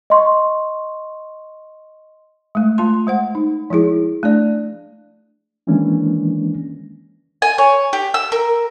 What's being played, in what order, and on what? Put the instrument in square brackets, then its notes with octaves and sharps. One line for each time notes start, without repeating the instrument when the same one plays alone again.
[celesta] D#5 C6 C#6
[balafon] G#3 A3
A3 F4 A5 C6
G#3 C5 F#5
D#4
F3 G#3 E4 G#4
A3 D4 D5
[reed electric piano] D#3 E3 G#3 A#3 C#4 D4
[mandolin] G#5
C#5
G4
E6
A#4